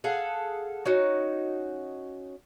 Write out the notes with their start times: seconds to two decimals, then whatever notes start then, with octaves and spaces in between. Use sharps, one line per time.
0.04 G#4 A4 F5 F#5
0.86 C#4 D#4 F#4